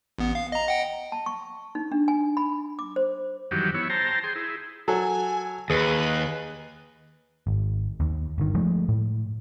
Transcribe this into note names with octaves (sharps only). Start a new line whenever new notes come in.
A1 B3
F5
D#5 A#5
D#5 F#5 G5
A5
C#6
D#4
D4
G#5
B5
D6
C5
F#2 D#3 E3 F#3 G3 G4
B3 E4 C#5
C5 G5 A5 A#5
G#4 G5 C6
E4 G#4
F#3 A4 G#5
D#2 G#4 B4
G#1
D#2
G1 D#3
F3 G#3 A3
A2